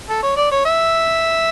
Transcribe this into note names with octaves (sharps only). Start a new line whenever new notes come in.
A4
C#5
D5
C#5
E5